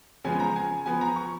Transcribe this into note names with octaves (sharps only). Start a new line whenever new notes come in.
C#3 F3 G#3 B3 G#5
A#5
G#5
F3 B3 G#5
A#5
C#6